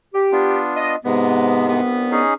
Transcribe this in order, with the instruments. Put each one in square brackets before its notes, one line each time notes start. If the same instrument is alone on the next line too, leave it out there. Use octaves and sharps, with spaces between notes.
[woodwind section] G4
[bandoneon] B3 D4 F4
[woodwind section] D#5
[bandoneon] G#2 C3 G#3 [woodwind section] B3
[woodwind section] C2 G2 B3
[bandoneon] C#4 D#4 G#4